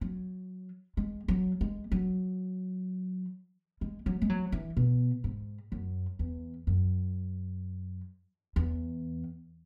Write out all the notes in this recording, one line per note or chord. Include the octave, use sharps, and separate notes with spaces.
F#3
G#3
F#3
G#3
F#3
G#3
F#3
G#3
F#3
E3
B2
G#2
F#2
E2
F#2
E2